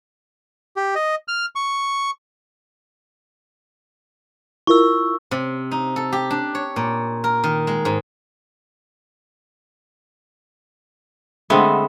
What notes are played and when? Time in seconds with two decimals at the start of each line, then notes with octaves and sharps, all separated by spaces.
0.76 G4
0.95 D#5
1.28 F6
1.56 C#6
4.67 E4 F4 A#4 C#6 E6
5.31 C3
5.71 D#4
5.96 A4
6.12 G4
6.30 D4
6.55 C#5
6.76 A#2
7.24 A#4
7.44 D#3
7.67 G#3
7.85 G#2
11.50 D3 G#3 A3 B3 C4